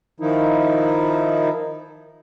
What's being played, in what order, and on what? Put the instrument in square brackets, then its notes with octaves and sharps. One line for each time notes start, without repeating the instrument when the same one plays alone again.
[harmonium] D#3 F3 D#4 E4